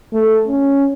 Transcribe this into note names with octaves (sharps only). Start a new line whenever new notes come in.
A3
C#4